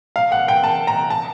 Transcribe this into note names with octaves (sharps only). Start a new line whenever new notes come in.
F5
F#5
G5
A5
A#5
A5